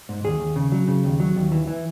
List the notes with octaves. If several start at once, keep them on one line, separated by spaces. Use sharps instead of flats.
G#2
D#2 G#4
D#2
C#3
F#3
C#3
D#2
F#3
D#2
E3
E3